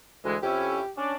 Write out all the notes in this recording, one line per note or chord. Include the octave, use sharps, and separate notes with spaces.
D2 E3 G#3
F2 C#4 E4 G4
C#4 D4 D5